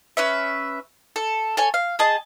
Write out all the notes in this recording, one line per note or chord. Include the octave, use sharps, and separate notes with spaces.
C#4 B4 E5
A4
A4 C#5 G#5
F5
G#4 D#5 A5